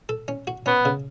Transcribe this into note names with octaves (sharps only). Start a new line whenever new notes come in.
A4
C#4
F#4
B3 C#4
C#3